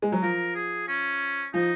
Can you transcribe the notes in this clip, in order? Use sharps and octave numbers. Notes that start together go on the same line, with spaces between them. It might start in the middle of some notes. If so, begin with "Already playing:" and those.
G#3
F#3
F3 A#4
G#4
C#4
F3 D#4